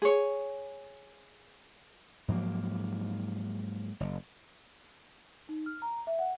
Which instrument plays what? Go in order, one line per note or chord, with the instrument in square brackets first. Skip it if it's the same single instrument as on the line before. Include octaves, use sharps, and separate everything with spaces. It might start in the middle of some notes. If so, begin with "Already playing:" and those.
[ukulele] G#4 C#5
[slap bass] G#2 F3 F#3 A#3
F#1
[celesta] D#4
F6
A#5
E5
F#5